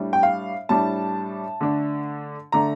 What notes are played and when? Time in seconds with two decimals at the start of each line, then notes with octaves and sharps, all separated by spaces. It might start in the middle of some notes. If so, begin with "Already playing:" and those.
Already playing: A2 G3 D4
0.13 G5
0.23 F5
0.69 A2 G3 D4 A5
1.61 D3 A3 D4
2.52 D3 A3 D4 A#5